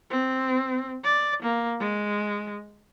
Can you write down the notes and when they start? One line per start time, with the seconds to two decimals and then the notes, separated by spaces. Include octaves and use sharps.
0.11 C4
1.04 D5
1.43 A#3
1.80 G#3